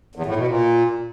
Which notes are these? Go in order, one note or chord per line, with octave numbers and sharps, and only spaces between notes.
E2
A2
B2
A#2